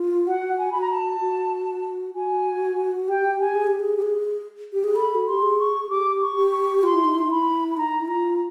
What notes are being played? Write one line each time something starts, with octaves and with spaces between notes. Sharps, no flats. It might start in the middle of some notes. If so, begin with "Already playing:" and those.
Already playing: F4
F#4 F#5
G#5
F#4 B5
A#5
A5
F#4
F#4 G#5
G4 G5
G#5
G#4
G4
G#4
G4
G#4
G4
G#4
A4 B5
F#4
G4 C6
G#4
C#6
G4 D6
C#6
G4
C#6
F4 C6
E4
D#4
E4
D#4 C6
E4 B5
B5
D#4 A#5
E4
F4 A#5